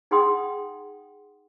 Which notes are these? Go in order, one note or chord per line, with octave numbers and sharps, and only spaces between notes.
D#4 G#4 F#5 G5 C6 D#6